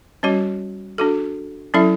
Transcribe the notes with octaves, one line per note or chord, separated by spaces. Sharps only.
G3 C#4 F#4 C#5
D4 F#4 A4
F#3 C#4 E4 A4 E5